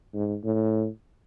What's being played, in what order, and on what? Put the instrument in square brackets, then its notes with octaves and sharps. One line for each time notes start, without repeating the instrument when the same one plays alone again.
[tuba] G#2
A2